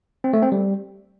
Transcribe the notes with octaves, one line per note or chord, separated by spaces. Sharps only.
C4
A3
C4
G3